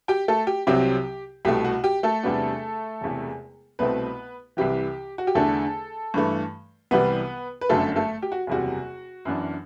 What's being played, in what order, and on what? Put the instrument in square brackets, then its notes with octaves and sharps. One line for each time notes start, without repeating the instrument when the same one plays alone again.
[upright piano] G4 G5
A3 A4
G4
C2 C3 F#3 C4 G4
C2 B2 A3 G4
F#4
G4
A3 A4
E2 C3 G3 B3 D4
E1 E2 C3
C2 B2 A3 B3 C4 B4
C2 C3 E3 G4
F#4
G4
E2 D3 A3 D4 A4
G2 E3 A3
C2 C3 E3 G3 B3 B4
B4
G1 F#2 D3 A3 A4
A3 A4
G4
F#4
F#1 E2 C3 G3 F#4
F#2 E3 B3 D4